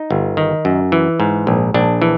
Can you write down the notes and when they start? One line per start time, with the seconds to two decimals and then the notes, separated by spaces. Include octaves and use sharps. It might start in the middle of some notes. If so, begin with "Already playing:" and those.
Already playing: D#4
0.11 G1
0.37 D#3
0.65 F#2
0.92 E3
1.20 G#2
1.47 A#1
1.74 A#1 D4
2.02 E3